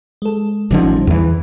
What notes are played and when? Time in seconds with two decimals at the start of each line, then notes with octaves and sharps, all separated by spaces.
0.22 G#3 A4
0.71 A1 D3 F3 G3 C#4 D#4
1.07 E2 E3 E5